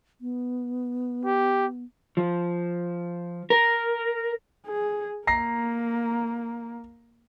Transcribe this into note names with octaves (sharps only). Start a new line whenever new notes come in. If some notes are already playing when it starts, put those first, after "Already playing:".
B3
G4
F3
A#4
G#4
A#3 A#5 A#6 C7